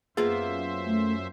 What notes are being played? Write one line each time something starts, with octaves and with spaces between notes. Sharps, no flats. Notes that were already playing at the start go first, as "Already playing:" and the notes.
F#2 A#3 B3 F4 G#4 C5 E5
A3